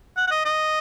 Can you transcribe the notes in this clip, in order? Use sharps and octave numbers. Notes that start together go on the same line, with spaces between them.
F#5
F#5
D#5
D#5